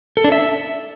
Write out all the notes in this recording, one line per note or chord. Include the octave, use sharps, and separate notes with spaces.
A4
D4
E5